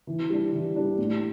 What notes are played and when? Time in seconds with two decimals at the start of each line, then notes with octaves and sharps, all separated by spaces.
0.07 E3
0.30 G3 D4
0.53 E3
0.76 G3 D4
0.98 A2